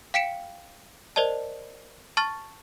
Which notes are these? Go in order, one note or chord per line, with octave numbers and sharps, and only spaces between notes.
F5 G5 B6 C#7 D7 E7
A#4 C5 D5 D#5 A5
A5 C#6 F6 A6